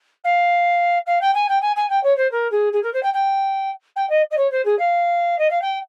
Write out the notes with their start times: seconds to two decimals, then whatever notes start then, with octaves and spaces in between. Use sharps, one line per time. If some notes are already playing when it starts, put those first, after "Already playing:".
0.24 F5
1.06 F5
1.21 G5
1.34 G#5
1.49 G5
1.61 G#5
1.76 G#5
1.89 G5
2.03 C#5
2.17 C5
2.31 A#4
2.51 G#4
2.73 G#4
2.83 A#4
2.93 C5
3.03 G5
3.13 G5
3.96 G5
4.09 D#5
4.31 D#5
4.37 C#5
4.51 C5
4.65 G#4
4.79 F5
5.38 D#5
5.50 F5
5.61 G5